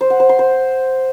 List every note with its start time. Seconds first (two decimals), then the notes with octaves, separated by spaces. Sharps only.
0.01 C5
0.10 F#5
0.20 C5
0.29 C6
0.39 C5